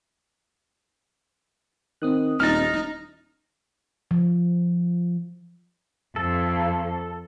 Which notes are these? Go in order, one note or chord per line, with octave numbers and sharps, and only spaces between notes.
D#3 C4 D#6 F#6
D#1 D#4 F6 A6
F3
F2 A4